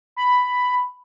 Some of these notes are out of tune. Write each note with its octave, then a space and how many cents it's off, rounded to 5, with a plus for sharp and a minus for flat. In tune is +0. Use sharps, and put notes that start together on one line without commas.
B5 +5